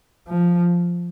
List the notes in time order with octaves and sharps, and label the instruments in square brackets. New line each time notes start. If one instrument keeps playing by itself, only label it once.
[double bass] F3